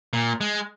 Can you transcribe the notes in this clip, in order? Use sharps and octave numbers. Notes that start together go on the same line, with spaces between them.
A#2
G#3